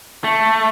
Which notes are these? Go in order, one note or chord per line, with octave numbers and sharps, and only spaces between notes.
A3